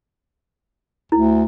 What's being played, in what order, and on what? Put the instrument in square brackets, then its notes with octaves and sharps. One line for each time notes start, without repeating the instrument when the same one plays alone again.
[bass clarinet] D2 [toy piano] E4